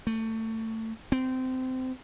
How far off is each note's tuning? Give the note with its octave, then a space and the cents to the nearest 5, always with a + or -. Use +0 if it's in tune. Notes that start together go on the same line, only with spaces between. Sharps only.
A3 +25
C4 -20